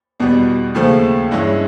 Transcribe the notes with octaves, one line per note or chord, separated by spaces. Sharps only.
E2 B2 G3 B3
D#2 C#3 F3 A3
G2 E3 G#3 C#4 E4